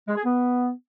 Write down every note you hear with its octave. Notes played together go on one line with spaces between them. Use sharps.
G#3
G#4
B3